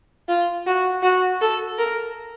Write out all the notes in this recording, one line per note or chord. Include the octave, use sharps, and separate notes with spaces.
F4
F#4
F#4
A4
A#4